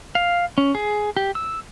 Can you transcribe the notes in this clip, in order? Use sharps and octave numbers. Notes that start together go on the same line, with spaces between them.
F5
C#4
G#4
G4
E6